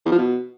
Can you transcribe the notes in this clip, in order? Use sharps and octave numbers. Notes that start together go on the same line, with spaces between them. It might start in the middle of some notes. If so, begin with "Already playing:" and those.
E2
F3
B2